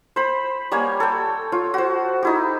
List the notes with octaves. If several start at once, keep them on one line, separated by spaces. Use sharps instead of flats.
C5 B5
G3 A#3 C#5 G#5
A4 G5
F4 C#5
F#4 C5
D#4 E4 G4